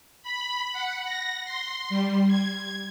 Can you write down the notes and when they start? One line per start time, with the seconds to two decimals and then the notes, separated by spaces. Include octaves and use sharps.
0.23 B5
0.73 F#5
1.05 A#6
1.45 C6
1.89 G3
2.28 G#6